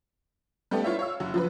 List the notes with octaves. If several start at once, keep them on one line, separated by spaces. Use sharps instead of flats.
G3 A3 B3 G4 A4 D5
E4 F4 C#5 E5
C#5 F5 E6
F#1 F#3
F3 F#3 B4